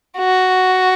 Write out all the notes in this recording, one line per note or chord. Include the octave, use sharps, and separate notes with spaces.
F#4